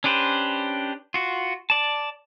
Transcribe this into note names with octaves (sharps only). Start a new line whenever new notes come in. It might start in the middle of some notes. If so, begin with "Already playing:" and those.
C#4 D4 G4 B4 C5
F4 F#4
D5 A5